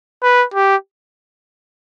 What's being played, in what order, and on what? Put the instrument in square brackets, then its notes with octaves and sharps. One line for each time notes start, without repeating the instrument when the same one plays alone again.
[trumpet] B4
G4